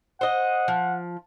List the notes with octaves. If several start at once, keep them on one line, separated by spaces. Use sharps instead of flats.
C5 D#5 F#5
F3